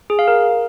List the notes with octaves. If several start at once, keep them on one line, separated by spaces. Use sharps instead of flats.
G#4
F5
A#4